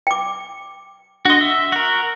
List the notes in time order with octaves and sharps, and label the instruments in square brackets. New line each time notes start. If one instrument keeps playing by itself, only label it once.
[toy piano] G5 D6
[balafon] D4 C6 [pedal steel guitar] F#4 D#5
[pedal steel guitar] E5
F#4 A#4